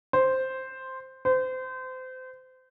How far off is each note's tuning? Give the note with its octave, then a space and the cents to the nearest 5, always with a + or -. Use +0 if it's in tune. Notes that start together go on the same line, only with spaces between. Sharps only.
C5 +0
C5 -30